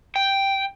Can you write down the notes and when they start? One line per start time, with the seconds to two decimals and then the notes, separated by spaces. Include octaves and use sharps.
0.16 G5